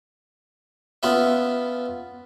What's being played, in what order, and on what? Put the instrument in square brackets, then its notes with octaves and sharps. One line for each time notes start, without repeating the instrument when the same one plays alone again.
[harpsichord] B3 C#4 F4 B4 E5